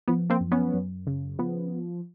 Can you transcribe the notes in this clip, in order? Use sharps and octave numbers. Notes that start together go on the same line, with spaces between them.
F3 B3
A#3 C4
F#2
B3 C#4
F#2
C#3
F3 B3